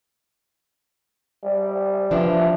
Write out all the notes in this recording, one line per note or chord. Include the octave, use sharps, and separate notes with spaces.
G3
E3 F3 D4